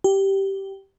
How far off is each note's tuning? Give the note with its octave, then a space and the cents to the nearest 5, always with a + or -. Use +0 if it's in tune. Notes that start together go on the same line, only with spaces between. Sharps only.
G4 -10